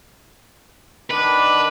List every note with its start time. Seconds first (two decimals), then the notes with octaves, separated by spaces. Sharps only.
1.11 D#3 D4 B4